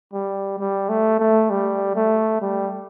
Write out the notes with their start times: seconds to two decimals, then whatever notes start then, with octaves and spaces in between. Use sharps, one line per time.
0.13 G3
0.59 G3
0.89 A3
1.19 A3
1.50 G3
1.96 A3
2.41 G3